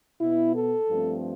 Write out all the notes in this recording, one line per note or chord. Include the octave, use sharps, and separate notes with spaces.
B2 B3 E4
A4
G2 F3 A3 C4